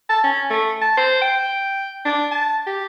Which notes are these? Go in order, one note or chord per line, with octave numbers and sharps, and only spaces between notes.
A5
C#4
A3
A5
C5
G5
D4
A5
G4